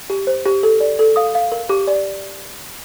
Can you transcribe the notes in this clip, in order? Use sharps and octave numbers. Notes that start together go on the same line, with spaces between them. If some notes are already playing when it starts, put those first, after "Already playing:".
G4
C5
G4
A4
D5
A4
F5 D#6
F5
A#4
G4 D6
D5